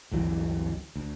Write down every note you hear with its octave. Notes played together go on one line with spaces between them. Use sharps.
G1 D2 E3 F#3
D2